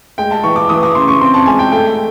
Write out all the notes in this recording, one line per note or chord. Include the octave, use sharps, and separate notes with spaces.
G#3 G5
A5
E3 C#6
D6
E3 D#6
D6
C#3 C6
C#6
C4 C6
A5
G#3 G#5
G5
A3 G5